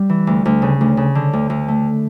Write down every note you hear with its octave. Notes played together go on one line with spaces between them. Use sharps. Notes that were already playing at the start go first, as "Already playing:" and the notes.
Already playing: G3
E3
D2
D2
C#3
D2
C#3
D3
D2
D2
A3